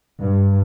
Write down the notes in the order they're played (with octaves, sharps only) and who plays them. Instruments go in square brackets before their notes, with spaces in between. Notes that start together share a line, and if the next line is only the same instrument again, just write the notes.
[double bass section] G2